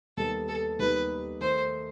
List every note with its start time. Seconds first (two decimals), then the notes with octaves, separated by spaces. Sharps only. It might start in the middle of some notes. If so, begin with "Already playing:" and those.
0.17 D#2 D#3 G3 B3 D#4 A4
0.48 A4
0.79 D#2 D#3 G3 B3 D#4 B4
1.41 D#3 A3 D#4 A4 C5